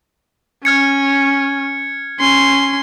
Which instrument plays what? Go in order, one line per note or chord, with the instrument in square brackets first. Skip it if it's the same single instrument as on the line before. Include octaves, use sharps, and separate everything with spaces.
[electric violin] C#4 [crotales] F6 G#6 C#7
[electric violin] C#4 C6